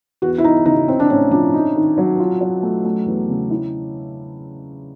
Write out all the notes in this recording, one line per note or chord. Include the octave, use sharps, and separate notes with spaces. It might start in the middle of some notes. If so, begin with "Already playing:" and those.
E2 F#4
E4
E2 D#4
C#3 D#4
C4 C#4
D4
A2 C#4
F3 D4
D#4
D#3
F#3
F4
F#3
A3
A3
E2
C#3
E4